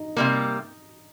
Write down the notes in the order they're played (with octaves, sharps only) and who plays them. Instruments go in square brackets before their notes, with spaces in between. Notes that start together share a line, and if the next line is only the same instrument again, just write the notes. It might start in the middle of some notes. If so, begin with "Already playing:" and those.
Already playing: [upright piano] D#4
[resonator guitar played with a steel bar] C3 G3 A#3